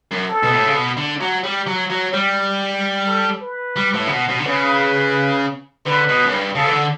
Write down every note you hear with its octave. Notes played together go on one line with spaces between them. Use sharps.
F#2
A4
B2
A2
C#3
B2
D3
F#3
G3
F#3
F#3
G3
A4
B4
G3
A2
C#3
B2
B2
D3
C#3 B4
D3 B4
B2
F#2
G2
C#3 A4
E3
D3